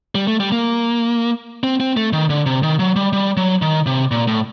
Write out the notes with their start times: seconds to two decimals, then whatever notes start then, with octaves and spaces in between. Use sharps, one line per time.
0.15 G3
0.27 A3
0.40 G3
0.52 A#3
1.63 C4
1.80 C4
1.97 A3
2.13 D#3
2.30 D3
2.46 C3
2.63 D#3
2.79 F#3
2.96 G3
3.13 G3
3.37 F#3
3.62 D#3
3.86 C3
4.11 A#2
4.27 A2